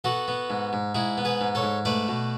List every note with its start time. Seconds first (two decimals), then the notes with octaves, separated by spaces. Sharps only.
0.04 B3 F#4 A4
0.28 B3
0.50 G#2
0.73 G#2
0.95 G#2 E4 G#4
1.18 B3
1.25 G#4 B4
1.41 G#2
1.55 A4 C#5
1.63 G#2
1.85 A3 B4 D5
2.08 B2